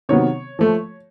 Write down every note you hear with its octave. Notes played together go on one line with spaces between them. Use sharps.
C3 D#3 F#3 B3 C#5
F3 A3